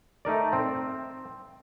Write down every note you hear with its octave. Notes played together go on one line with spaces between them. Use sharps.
A3 D#4 A#4 D5
C4